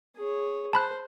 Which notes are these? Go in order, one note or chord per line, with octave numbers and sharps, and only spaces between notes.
G#4 C#5
C5 A5 B5 F#6